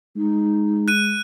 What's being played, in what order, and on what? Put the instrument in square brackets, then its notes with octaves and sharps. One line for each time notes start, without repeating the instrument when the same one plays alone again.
[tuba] G#3 [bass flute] D#4
[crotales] F#6 D#7